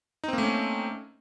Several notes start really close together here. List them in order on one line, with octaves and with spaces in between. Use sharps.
D#4 C4 A#3 A3 C#4